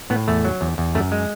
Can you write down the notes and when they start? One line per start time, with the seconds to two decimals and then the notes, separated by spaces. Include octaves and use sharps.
0.10 A2 B3
0.28 E2 A3
0.45 F#3
0.61 E2
0.78 E2
0.95 F#2 A3
1.12 G#3